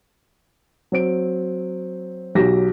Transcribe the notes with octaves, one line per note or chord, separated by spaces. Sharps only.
F#3 C4 D7
B1 F#3 G4 A#6